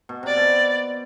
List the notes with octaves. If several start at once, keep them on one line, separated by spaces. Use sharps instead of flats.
B2
C3 D5
B2